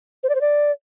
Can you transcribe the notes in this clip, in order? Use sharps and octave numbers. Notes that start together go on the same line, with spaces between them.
C5
D5
C5
D5